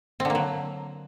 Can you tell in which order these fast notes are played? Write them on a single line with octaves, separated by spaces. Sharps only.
C4 D3 A#3 F#3